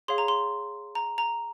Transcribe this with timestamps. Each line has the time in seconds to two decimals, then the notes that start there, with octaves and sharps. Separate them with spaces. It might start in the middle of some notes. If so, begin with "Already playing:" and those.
0.08 G#4 C#5 F5 C6
0.18 A#5
0.28 C6
0.95 A#5
1.18 A#5